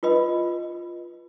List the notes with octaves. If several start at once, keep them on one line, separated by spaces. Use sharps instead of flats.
F4 B4 D#5 B5